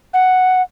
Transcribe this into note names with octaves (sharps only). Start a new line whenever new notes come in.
F#5